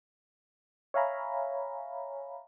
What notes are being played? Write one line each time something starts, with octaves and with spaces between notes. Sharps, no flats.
C#5 E5 F5 G#5 A#5 B5